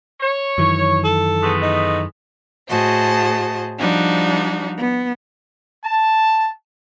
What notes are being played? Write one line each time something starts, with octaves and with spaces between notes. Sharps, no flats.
C#5
F#2 D#3 E3
A4
G#3 A3 B3
D#4
A2 F#4 G#4 C5 D#5 A5
F3 G3 D4 D#4 F#4
B3
A5